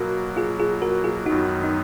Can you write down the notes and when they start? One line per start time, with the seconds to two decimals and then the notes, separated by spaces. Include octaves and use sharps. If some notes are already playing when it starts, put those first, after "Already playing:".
Already playing: B2 F#3 A#3 F#4 A#4
0.36 F4 G#4
0.60 F4 G#4
0.82 F#4 A#4
1.04 F4 G#4
1.26 F#2 D#3 F#3 B3 D#4 F#4
1.64 D#4